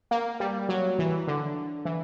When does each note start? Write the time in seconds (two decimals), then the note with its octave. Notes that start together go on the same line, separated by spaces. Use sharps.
0.11 A#3
0.40 G3
0.69 F#3
0.99 E3
1.27 D3
1.85 E3